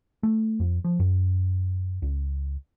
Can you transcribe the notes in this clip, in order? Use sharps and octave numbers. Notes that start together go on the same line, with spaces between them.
A3
F2
F3
F#2
C#2